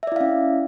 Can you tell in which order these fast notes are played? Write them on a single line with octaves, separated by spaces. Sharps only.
E5 D5 E4 F5 C#4